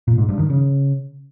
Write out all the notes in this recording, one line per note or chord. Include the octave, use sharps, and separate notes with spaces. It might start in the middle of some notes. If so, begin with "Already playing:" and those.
A#2
G#2
G2
D#3
C#3